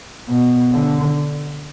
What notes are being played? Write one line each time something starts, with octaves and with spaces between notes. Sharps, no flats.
B2
D3